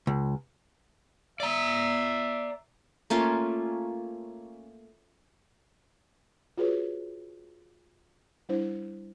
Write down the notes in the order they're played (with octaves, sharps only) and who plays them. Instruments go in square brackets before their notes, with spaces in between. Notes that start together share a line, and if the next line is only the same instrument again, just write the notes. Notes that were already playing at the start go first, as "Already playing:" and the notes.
[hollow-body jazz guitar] C#2
[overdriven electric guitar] D5 A#5 [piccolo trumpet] E5
[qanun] A3 A#3 C#4 F4
[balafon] F4 F#4 G#4 B4 C#5
G3 D4 E4 C5